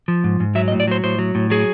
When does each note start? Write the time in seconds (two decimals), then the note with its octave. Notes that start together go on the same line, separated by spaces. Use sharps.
0.08 F3
0.24 G#2
0.40 G#2
0.55 F#3 E5
0.68 D#5
0.72 A2
0.80 D5
0.88 F#3 C5
1.04 A2 C5
1.19 F#3
1.35 A2
1.50 F#3 G#4